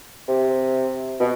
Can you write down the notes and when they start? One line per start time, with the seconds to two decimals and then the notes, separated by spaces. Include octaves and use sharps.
0.28 C3
1.20 B2